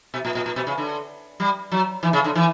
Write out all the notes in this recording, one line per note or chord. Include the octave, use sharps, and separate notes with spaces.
B2
A#2
A#2
A#2
B2
C#3
D3
G3
F#3
E3
C#3
D3
E3